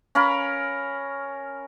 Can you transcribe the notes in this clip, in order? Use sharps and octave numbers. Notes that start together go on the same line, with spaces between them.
C#4 A#4 F5 B5